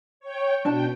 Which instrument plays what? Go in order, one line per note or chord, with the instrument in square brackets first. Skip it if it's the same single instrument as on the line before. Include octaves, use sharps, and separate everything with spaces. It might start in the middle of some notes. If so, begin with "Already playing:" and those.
[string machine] C#5 G5
[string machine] B2 G5 [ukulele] D4 A5